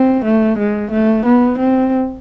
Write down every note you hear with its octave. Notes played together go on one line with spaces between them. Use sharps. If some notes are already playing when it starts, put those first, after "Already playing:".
Already playing: C4
A3
G#3
A3
B3
C4